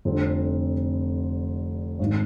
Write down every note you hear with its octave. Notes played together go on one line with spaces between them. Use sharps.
F1 F2 D3 G3 C4
G#1 D#3